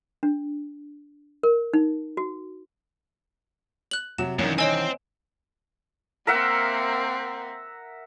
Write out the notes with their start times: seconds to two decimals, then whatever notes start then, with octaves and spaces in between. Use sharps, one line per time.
0.23 D4
1.43 A#4
1.73 D#4
2.17 F#4
3.91 F#6 F#7
4.18 C3 F#3 E7
4.39 C2 F#2 D#3 E3 C#4
4.58 C4 C#5 D#5 G#5
6.27 A#3 C4 A#4 E5 F#5